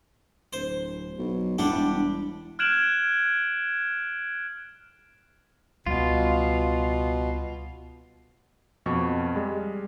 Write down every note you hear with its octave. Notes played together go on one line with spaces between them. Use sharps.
D1 C5
B1
E1 G3 D4 E4 G4 F#5
F6 F#6 G#6 D7 E7 F#7
C#2 B2 G3 F4
F2 B2 C#6
G3 G#3